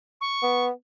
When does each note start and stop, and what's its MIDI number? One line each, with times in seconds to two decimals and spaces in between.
0.21 0.65 85
0.42 0.70 59